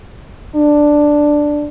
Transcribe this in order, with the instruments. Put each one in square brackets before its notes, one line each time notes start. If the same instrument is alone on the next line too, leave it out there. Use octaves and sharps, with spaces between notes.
[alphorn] D4